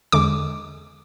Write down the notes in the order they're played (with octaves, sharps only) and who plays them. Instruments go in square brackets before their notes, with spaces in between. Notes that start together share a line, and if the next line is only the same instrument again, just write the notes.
[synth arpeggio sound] E2 D3 G#3 D6